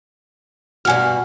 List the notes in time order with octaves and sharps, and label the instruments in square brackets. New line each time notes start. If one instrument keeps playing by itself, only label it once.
[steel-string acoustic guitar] G2 B2 F#4 [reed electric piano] G#5 F6